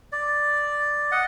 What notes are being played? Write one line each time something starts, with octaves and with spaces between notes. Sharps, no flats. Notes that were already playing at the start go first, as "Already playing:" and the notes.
D5
D#5 F#5